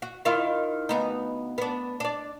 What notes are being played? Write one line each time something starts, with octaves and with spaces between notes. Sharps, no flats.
F#4
D#3 E4 F4
D2 B3 D#4
B3 D4
D4 D5